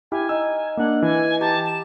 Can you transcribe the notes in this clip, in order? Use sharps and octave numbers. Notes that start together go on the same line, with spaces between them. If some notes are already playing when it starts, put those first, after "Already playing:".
E4 G4 F5 G#5
D#4 E6
A#3 D4 F#5
E3 G#5
G4 A5 A#5 D6
E7